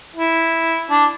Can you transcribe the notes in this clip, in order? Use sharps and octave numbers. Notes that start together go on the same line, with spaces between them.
E4
D4